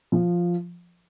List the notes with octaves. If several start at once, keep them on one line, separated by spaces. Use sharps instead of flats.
F3